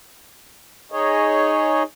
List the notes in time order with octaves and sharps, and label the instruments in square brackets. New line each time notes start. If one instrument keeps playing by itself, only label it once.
[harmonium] D#4 G#4 C#5 D#5